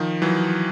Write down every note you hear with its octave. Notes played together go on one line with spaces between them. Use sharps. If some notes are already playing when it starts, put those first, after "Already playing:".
Already playing: D#3 F3
E3 F#3